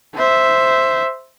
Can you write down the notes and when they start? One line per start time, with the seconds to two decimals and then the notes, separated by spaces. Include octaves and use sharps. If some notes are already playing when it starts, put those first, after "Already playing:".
0.15 C5 E5